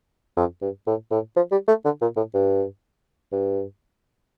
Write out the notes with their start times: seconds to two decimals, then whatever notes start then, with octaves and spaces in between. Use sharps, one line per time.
0.37 F2
0.62 G2
0.87 A2
1.11 A2
1.36 F3
1.52 G3
1.68 A3
1.85 D3
2.01 A#2
2.17 A2
2.34 G2
3.32 G2